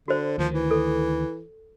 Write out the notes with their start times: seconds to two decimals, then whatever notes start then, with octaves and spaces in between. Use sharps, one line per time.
0.08 D3 F#4 C5
0.38 D2 D#3 F3
0.54 E3
0.71 A4